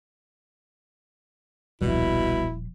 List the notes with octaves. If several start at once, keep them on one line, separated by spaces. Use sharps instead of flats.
D#1 B1 B2 F3 G3 E4